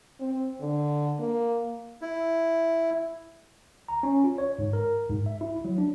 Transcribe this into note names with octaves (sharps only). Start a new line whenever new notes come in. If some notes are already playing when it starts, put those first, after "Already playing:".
C4
D3
A#3
E4
A#5
C#4
F4
C#5
G#2
A#4
G#2
E5
E4
F#3
D4